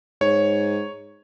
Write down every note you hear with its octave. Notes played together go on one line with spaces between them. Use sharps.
G#2 C#5